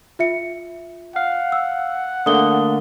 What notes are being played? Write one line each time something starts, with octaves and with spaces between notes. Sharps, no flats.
F4 E5 C#7
F5 F#5
E6
D3 A3 A#3 D#6 G7